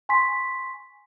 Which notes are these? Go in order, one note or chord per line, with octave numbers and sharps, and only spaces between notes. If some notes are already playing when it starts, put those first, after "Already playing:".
G#5 C6 C#6 B6